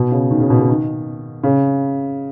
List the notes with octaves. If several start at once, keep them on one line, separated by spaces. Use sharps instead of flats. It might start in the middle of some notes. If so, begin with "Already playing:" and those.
Already playing: B2
C#3
D#3
C#3
B2
C#3
D#3
C#3